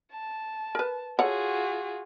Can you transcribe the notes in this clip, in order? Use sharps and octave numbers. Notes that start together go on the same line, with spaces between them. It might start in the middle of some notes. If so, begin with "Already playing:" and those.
A5
A#4 B4
F4 F#4 G#4 A4 C#5 F#5